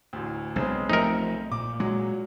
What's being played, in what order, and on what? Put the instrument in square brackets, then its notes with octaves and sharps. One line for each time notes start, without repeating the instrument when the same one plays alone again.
[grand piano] A1 D2
[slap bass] B1 [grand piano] C#3 G#3 C4
[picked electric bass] F3 A3 [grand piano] C4 E5 C#7 [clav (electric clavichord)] D#4 A#4
[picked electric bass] A#2 [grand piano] D6
[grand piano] F#3 [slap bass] G#3